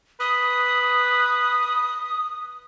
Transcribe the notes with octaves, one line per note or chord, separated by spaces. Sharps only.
B4 D#6